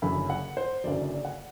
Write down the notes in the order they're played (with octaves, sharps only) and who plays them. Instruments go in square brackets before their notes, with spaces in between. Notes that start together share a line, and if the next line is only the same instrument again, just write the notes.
[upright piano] F#1 F#2 D3 F#3 B5
F#5
C5
F#1 F#2 D3 F#3 D5
D5
F#5